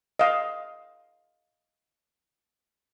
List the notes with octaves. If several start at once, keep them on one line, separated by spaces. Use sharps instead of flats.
D#5 F5